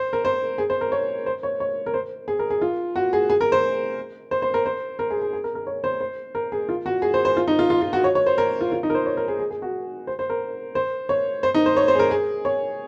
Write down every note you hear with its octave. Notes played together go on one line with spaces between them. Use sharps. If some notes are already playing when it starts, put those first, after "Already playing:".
Already playing: C5
A#4
C5
G#4
C5
A#4
C#5
C5
C#5
C#5
A#4
C5
G#4
A#4
G#4
F4
F#4
G#4
G#4
A#4
C5
C5
C5
A#4
C5
A#4
G#4
G#4
G#4
A#4
A#4
C#5
C5
C5
A#4
G#4
F4
F#4
G#4
C5
C5
F4
D#4
F4
F4
F4
F#4
C#5
C#5
C5
A#4
F4
F4
D#4
A#4
C5
C#5
A#4
G#4
G#4
G#4
F#4
C5
C5
A#4
C5
C#5
C5
D#4
C5
C#5
C5
G#4
A#4
G#4
C#5